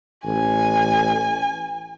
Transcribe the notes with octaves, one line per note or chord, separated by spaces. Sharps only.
A1 G#5